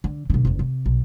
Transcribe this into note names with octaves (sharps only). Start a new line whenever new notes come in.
D3
B1 D3
F#1 E2
C3
B1